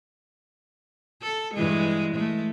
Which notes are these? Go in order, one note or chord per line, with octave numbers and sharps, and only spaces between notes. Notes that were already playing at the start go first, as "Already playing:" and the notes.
A4
G2 E3 G#3
G#3 A3